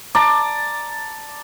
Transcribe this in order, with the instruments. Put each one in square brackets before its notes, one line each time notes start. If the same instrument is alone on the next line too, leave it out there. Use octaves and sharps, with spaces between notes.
[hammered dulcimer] D5 A5 A#5